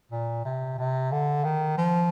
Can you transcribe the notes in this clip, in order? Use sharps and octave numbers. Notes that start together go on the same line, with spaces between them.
A#2
C3
C3
D3
D#3
F3